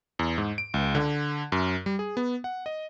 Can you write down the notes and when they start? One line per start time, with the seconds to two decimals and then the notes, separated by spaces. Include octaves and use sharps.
0.19 E2
0.38 G#2
0.58 D7
0.74 C#2
0.95 D3
1.52 F#2
1.86 G3
1.99 G#4
2.17 B3
2.44 F#5
2.66 D#5